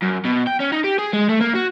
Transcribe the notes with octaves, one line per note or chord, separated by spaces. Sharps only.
F#2
B2
G5
C#4
D#4
G4
G#4
G#3
A3
A#3
F#4